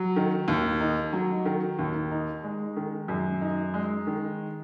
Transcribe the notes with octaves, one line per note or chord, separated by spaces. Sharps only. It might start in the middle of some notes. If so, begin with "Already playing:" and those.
Already playing: F#3
D#3
D#2
D#4
F#3
D#3
D#2
D#4
G#3
D#3
F#2
D#4
G#3
D#3